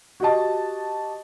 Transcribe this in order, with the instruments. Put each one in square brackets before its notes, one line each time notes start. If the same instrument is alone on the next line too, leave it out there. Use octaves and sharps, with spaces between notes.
[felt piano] F#4 G4 D#5 A5